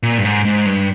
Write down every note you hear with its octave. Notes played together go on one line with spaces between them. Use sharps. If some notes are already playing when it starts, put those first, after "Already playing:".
A#2
G2
G#2
G#2
G2